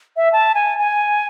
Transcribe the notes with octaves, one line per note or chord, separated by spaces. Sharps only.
E5
A5
G#5
G#5